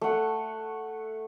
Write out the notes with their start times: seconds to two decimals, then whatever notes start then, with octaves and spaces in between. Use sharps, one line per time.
0.01 A3 F#5